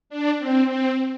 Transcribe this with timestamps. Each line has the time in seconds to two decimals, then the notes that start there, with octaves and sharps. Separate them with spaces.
0.10 D4
0.39 C4
0.69 C4